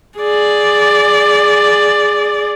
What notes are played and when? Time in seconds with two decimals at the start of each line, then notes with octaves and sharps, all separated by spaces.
0.19 G#4 D5